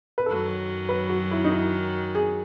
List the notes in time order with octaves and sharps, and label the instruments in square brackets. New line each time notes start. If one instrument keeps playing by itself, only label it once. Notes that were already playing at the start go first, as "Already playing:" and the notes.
[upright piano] B4
[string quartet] F#2 D#3 F#3 [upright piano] A4
[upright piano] B4
F#4
E4
D#4
E4
G#4